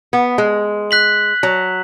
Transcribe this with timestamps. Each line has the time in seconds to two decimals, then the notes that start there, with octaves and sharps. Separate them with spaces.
0.13 B3
0.38 G#3
0.91 F#6 B6 F#7
1.43 F#3